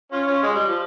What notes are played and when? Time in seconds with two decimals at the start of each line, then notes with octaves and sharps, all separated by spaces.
0.12 C#4 F4
0.27 C#4 F4
0.43 G#3
0.55 G3
0.67 F3